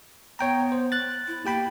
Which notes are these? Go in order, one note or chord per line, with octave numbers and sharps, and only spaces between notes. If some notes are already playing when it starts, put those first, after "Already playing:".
B3 C#5 G5 A#5
C5
F#6 A6
E4
A#3 G4 G5 B5